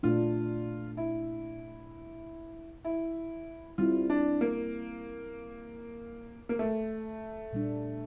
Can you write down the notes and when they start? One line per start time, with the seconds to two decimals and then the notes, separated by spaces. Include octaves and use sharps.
0.03 A#2 A3 D4 F4
0.97 E4
2.85 E4
3.78 G3 C4 E4 F4
4.10 D4
4.41 A#3
6.49 A#3
6.59 A3
7.53 A#2 G3 D4